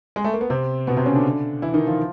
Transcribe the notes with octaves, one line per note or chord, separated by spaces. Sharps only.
G#3
A3
A#3
B3
C3 C4
B2 B3
C3 C4
C#3 C#4
D3 D4
E3 E4
D#3 D#4
F3 F4